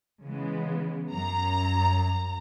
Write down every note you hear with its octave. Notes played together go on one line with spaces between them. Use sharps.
C#3 E3 G#3 B3
F#2 A#5